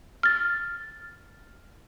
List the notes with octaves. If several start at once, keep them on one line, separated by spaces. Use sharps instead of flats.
F6 A6